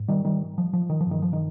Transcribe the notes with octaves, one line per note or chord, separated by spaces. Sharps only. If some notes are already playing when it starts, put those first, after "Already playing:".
Already playing: G#2
D#3 G3
D#3 G3
F3
F3
D#3
F3
G2 D#3
F3
D#3